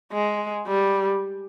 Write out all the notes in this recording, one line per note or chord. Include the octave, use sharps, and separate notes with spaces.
G#3
G3